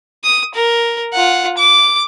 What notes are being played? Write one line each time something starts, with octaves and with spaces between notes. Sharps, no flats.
D#6
A#4
F4 F#5
D6